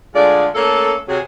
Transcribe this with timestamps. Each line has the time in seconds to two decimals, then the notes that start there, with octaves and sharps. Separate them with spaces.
0.15 D3 G#3 A3 F4 G#4 D5
0.55 A3 A#3 C#4 A4
1.08 C3 F#3 G#4